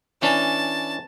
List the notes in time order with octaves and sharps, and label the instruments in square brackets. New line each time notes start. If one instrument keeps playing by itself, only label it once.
[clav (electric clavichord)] E3 C#4 D4 [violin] A5